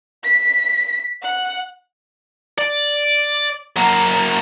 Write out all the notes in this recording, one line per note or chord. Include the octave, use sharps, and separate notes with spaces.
B6
F#5
D5
F#3 A#3